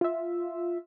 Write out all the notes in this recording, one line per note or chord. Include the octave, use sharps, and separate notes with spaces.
F4 E5